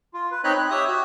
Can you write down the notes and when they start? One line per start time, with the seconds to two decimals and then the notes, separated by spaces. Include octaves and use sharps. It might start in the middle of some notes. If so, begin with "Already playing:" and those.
0.14 F4
0.31 B4
0.44 C4 D#4 C#5 D#5 B5 F#6
0.59 F#6
0.71 G4 C#5 E5 D#6
0.87 F#4